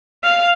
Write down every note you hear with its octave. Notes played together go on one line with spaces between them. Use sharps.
F5